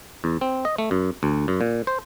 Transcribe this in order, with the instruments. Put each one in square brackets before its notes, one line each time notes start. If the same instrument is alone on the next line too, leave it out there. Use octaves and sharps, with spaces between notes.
[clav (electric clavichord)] E2
C4
D#5
A3
F#2
D2
F#2
A#2
C5